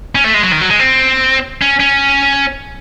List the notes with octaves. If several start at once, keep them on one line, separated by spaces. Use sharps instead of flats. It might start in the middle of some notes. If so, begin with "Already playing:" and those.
C#4
A3
G#3
F#3
D#3
F#3
G#3
C4
C#4
C#4